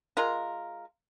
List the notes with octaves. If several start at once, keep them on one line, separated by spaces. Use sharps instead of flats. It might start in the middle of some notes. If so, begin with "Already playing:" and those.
G#3 F4 A#4